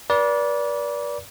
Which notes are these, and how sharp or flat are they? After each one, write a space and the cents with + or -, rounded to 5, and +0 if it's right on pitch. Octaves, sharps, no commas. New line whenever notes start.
B4 -40 D5 -20